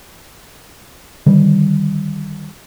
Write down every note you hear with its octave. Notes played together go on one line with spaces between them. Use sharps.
D3 D#3 G3